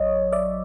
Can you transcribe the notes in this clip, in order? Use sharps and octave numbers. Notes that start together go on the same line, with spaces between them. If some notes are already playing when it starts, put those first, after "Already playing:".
Already playing: A1 F#3 C#5 D#5
D5 E5